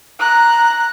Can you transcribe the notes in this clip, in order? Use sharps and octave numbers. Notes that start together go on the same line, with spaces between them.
A#5 F#6